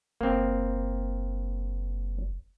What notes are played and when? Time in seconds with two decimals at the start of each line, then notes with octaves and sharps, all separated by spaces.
0.21 F#1 A#3 C4